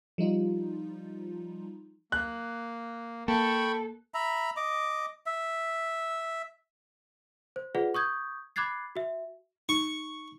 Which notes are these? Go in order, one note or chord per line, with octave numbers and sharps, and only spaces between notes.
F3 G3 D#4 F4
A#3 F#6
A#3 A4 G5 B5 C#6
E5 A#5 B5
D#5 D6
E5
C5
F4 G#4 B4 D5 F#5
C#6 D#6 G6 G#6
B5 D6 F#6 G#6 A6 C7
F#4 E5
D#4 C#6